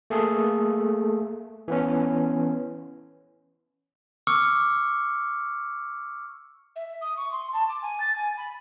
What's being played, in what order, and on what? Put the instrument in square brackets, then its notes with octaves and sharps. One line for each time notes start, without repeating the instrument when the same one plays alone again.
[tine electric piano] A3 A#3 G#4 A4
E3 B3 C#4
[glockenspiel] C#6 D6 E6 F6 C#7
[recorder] E5
D#6
C#6
C6
A5
D6
G#5
A6
G#5
B5